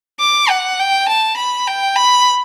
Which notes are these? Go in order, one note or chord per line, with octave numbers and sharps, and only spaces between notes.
D6
F#5
G5
A5
B5
G5
B5